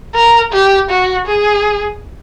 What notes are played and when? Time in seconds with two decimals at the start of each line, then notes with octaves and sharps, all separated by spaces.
0.15 A#4
0.53 G4
0.90 F#4
1.27 G#4